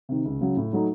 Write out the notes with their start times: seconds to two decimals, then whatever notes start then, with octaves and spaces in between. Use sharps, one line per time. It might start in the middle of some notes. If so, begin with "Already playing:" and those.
0.09 C3 D#3
0.25 C#2
0.41 C#3 F#3
0.57 A2
0.73 F#3 A3 D#4